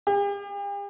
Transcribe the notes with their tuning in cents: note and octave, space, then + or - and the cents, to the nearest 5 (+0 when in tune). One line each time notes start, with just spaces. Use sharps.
G4 +45